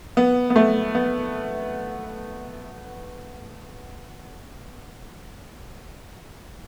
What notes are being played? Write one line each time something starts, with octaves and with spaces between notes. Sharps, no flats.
B3
B3
A3
B3